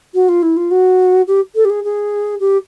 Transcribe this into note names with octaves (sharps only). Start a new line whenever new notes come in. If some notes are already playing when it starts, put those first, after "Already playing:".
F#4
F4
E4
F4
F#4
G4
A4
G4
G#4
G#4
G4